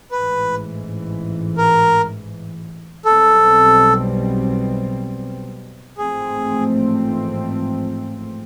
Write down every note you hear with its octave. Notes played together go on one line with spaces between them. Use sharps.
A1 G#2 E3 B4
A#4
B1 B2 G3 C4 A4
A1 G#2 F3 A3 C4 G#4